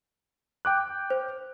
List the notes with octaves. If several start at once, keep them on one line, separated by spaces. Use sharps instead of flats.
G5 D6 F#6
C5